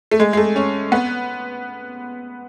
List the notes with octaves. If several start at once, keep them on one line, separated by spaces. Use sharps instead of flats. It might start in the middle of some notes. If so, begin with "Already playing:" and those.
A3
G#3
G#3
A3
C#4
B3